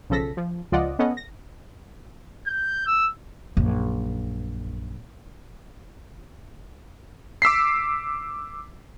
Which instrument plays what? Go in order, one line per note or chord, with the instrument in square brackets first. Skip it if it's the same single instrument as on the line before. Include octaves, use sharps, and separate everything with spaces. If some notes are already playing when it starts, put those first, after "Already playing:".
[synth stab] B1 C#3 F3 A4 A#6 B6
F3
C#2 F3 F4 D5 D#5 F#5
B3 C#4 A4 D#5 F#5
A#6
[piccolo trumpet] G6
E6
[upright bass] A#1 F#2
[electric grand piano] D6 E6 B6 C7